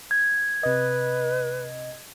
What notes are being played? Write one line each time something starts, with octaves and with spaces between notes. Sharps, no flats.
G#6
C3 B4 D#5